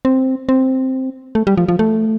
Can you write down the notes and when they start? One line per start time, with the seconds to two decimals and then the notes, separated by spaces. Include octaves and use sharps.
0.05 C4
0.49 C4
1.35 A3
1.47 G3
1.57 F3
1.69 F3
1.79 A3